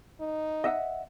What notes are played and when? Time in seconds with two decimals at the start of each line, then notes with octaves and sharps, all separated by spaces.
0.20 D#4
0.64 D#5 E5 F#5